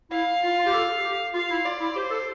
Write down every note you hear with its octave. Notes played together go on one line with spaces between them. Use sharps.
E4 F5
F4
F4
G4
A4
G4
F4 F5
E4
F4 D5
E4
G4 C5
A4